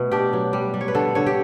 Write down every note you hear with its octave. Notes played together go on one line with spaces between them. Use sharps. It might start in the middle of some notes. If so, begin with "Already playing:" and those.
Already playing: B2 A3
D4 G4
F#3
G3
G3
C#5
B4
D3 A4
D3 C#5
G4